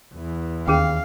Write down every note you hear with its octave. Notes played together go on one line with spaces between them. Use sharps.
E2 E3
D#2 C#4 G#4 F5 G5